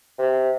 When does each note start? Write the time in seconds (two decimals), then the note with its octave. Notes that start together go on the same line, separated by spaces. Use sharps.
0.18 C3